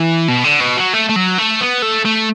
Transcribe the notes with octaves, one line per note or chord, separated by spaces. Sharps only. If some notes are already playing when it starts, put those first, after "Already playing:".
Already playing: E3
B2
D3
B2
F#3
A3
A3
F#3
A3
B3
A3
A3